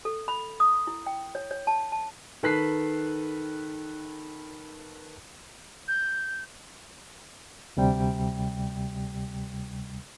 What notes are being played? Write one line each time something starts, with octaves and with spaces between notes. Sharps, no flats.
A4
B5
D#6
E4
G5
C#5
C#5
A5
A5
D#3 A4 B4 F#6 B6 C7
G6
D2 C3 G3 G5